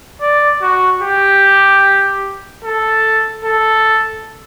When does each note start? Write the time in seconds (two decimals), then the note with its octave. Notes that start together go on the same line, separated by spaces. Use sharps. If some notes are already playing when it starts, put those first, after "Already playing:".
0.21 D5
0.62 F#4
1.02 G4
2.65 A4
3.45 A4